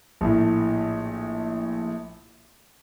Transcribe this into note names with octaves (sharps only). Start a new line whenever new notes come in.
A#1 A2